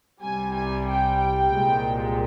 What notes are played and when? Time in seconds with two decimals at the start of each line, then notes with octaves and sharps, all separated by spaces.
0.22 C2 C3 G3 G#5
0.55 G#5
0.88 G5
1.21 G5
1.54 C2 A#2 G#3